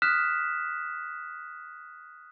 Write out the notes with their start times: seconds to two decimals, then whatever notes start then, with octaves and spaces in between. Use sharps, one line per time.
0.02 D#6 F6 F#6 B6 E7